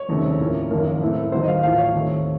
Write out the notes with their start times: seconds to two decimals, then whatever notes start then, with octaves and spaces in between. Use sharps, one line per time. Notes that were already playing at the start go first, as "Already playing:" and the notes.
Already playing: C#5
0.09 F1 D#2 C#3 A3 C4
0.39 A2 F3 A#3 C#4
0.70 F#1 F2 D#3 A#3 A#4
1.01 A2 A3 C4
1.32 D#2 D#3 F#3 C5
1.43 D#5
1.48 F5
1.63 A1 A2 F3 F5
1.78 C#5
1.94 D#2 D#3 A3 C4